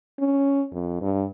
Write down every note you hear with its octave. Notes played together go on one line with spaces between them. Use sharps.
C#4
F2
G2